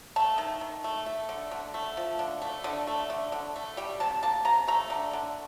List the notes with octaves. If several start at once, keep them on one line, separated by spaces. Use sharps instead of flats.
A3 A5
D#3
D#3
A3
A3
D3
D3
A3
F3
D3
A3
D3
A3
D3
D3
A3
G3 G5
C3 A5
A#3 A5
C3 A#5
A3 A#5
D3
D3